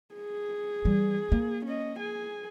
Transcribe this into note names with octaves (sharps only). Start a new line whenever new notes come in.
G#4
E3 G3
A#3
C#4 D#5
G#4 G#5